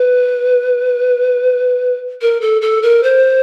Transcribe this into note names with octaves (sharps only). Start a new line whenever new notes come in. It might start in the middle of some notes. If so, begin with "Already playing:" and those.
Already playing: B4
A#4
A4
A4
A#4
C5